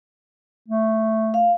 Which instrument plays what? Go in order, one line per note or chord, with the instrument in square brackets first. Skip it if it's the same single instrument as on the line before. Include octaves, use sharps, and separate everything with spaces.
[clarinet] A3
[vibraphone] F5